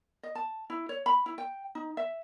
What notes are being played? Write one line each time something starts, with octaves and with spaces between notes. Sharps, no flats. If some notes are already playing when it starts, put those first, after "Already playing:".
D#5
A5
E4
C#5
B5
E4
G5
D#4
E5